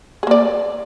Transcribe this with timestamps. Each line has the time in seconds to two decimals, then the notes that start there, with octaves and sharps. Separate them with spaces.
0.23 G#4
0.27 A#3
0.31 D5